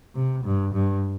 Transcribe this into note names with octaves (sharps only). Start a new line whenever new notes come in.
C3
G2
G2